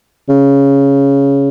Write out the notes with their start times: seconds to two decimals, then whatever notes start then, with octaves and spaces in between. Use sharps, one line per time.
0.29 C#3